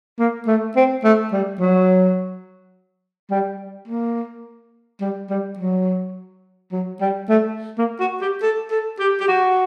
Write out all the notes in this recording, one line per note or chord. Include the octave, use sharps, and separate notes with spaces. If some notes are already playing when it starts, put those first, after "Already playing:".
A#3
A3
C4
A3
G3
F#3
G3
A#3
G3
G3
F#3
F#3
G3
A3
A#3
F#4
G4
A4
A4
G4
G4
F#4